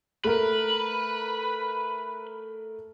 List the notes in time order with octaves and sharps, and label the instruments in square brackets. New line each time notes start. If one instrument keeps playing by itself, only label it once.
[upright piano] A3 A#4 [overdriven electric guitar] B4